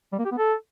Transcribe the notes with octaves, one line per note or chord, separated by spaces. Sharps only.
G3
A#3
G4
B3
A4